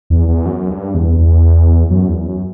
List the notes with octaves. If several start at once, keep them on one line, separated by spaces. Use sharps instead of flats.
E2
E2
F#2
G2
E2
E2
F#2
E2
F#2